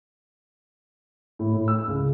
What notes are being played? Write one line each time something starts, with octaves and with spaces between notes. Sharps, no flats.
A2
A2
E6
C#2